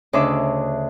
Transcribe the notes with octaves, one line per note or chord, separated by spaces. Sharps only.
D2 C#3 D4 D#5 E5 D6